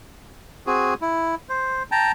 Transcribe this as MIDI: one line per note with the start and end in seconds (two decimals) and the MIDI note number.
0.67 0.94 60
0.67 0.94 66
0.67 0.94 68
1.02 1.35 64
1.49 1.83 72
1.91 2.12 79
1.91 2.12 81
1.91 2.12 82